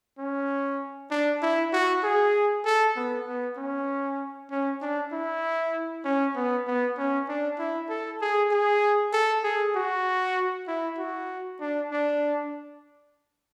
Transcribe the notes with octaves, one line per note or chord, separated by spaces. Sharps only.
C#4
D4
E4
F#4
G#4
A4
B3
B3
C#4
C#4
D4
E4
C#4
B3
B3
C#4
D4
E4
A4
G#4
G#4
A4
G#4
F#4
E4
F#4
D4
D4